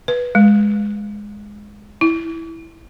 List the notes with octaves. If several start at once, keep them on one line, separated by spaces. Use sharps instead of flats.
B4
G#3
E4